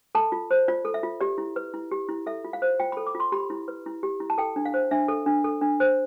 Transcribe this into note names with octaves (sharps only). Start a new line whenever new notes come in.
A4 A5
F4
C5
F4 D5
A4
E5
F4
G4 D5
E4
B4
E4
G4
E4
A4 E5
F4
F5
C5
F4 G5
B5
A4
D6
F4
C6
G4 B5
E4
B4
E4
G4
E4
A5
A4 G5
D4
F5
C5
D4 E5
A4
D4
A4
D4
C5